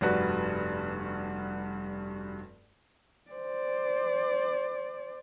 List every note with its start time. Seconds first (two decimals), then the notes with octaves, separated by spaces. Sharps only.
0.01 F1 G2 G3 F#4 B4
3.31 C5 D5